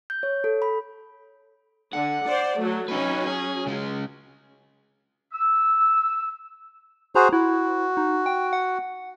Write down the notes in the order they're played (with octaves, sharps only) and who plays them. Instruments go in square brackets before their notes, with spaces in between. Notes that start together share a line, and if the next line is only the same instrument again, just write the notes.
[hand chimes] G6
C#5
A4
B5
[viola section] D3 [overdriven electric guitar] F#5
[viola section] C5 D5
F#3 A3
[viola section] F#3 C#4 [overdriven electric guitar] D#4 B4
[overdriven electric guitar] G#4
C#3 G#3
[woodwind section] E6
[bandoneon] F#4 G#4 C5 [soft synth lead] A#5
[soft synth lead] E4 [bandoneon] F#4
[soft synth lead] D#4
G5
F#5